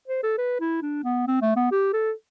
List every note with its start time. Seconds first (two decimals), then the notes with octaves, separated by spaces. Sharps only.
0.08 C5
0.23 A4
0.38 B4
0.60 E4
0.82 D4
1.04 B3
1.27 C4
1.42 A3
1.56 B3
1.71 G4
1.93 A4